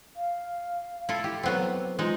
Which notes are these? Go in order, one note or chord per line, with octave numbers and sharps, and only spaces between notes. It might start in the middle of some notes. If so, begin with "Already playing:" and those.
F5
E4 F4 A4
E4 G4
F#3 B3 C4 A4
G#3 D#4 F4